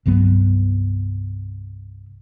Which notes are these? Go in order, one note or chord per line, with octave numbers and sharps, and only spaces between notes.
C2 G2 F#3 B3